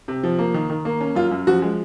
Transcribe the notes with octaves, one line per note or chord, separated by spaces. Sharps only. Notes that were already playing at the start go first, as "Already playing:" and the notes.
C3
F3
A#3
D#3
D#3
A#3
C#4
F#2 F4
F#2
F3 F#4
G#3